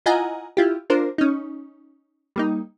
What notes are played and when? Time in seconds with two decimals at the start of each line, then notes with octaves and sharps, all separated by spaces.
0.06 E4 F4 D#5 F#5 G#5 A#5
0.57 E4 F4 G4
0.90 D4 F4 A#4 C5
1.18 C#4 D#4
2.36 G3 A#3 D#4